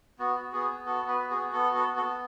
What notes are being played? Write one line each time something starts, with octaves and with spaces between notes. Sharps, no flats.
B3 F#4
F#4
B3 G#4
B3
F#4 A4
B3
B4
F#4
G#4
B3
B3 A4
F#4
A4
B3
A4
B3